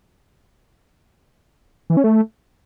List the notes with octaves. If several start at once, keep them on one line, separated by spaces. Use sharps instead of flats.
E3
C#4
A3